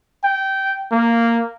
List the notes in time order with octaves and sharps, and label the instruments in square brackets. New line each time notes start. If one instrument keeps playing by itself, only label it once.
[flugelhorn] G5
A#3